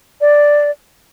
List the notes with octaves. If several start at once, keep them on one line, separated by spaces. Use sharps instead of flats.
D5